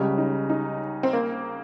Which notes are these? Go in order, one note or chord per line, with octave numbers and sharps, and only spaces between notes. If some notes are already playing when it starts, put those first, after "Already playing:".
Already playing: C#2 C#3 G3 C#4
D#4
D#4
C4
A#3